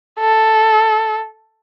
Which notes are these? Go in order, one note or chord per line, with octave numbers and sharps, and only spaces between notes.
A4